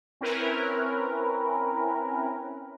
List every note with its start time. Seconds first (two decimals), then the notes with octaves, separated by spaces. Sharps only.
0.21 C4 C#4 E4 A#4 B4